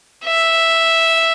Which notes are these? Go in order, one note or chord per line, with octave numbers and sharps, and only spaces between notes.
E5